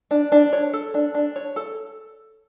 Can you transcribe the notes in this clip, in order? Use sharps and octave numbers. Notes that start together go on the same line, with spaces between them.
D4
D4
C#5
A4
D4
D4
C#5
A4